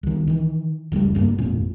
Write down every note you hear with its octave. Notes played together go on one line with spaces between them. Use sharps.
C2 D#3
D#3 E3
F1 C#2 G#2 G3
F#1 G2 C3 A#3
G#1 F2 A#2